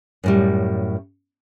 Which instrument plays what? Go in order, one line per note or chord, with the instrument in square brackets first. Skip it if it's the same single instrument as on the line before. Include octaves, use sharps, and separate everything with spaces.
[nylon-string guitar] F#2 A2 G3